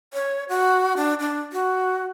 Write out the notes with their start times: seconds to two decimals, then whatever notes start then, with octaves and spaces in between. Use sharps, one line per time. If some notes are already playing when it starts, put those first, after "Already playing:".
0.14 C#5
0.49 F#4
0.97 D4
1.20 D4
1.53 F#4